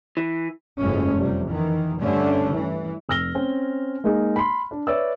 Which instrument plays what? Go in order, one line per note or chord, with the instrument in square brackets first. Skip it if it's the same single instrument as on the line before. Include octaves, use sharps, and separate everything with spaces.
[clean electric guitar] E3
[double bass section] F#1 F2 G#2 G#3 A3 C#4
F2 C3 G3
D#3 E3
G2 D3 A3 C#4
E3
[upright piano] F1 E6 F6 A#6 G7
C4 C#4
G#3 A#3 D#4 G#4
B5 C6
D4
B4 C#5 D5 E5 E6